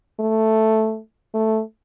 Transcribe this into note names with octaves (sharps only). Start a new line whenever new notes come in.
A3
A3